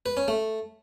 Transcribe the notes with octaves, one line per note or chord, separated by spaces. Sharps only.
B4
C#4
A3